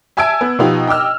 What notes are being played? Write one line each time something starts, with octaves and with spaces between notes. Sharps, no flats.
E5 G#5 A5 E6 G#6 D7
B3
B2 F3 B3 D#4 F4 G4
D#5 G5 D6 E6 F6